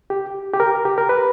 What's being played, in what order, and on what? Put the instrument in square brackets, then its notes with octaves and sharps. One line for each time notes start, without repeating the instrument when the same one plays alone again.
[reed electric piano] G4
G4
A#4
G4
A#4
B4